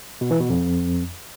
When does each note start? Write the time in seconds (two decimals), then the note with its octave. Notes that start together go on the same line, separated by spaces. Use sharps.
0.21 B2
0.31 E3
0.40 B2
0.50 F2